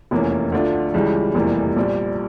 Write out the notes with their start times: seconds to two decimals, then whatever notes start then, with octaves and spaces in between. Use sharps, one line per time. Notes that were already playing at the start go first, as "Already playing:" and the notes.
0.11 F1 E2 E3 A#3 C#4
0.52 D2 D3 A3 D4 F4
0.94 C#2 C#3 E3 G3
1.34 F1 E2 E3 G3 A#3
1.76 A#1 A#2 G3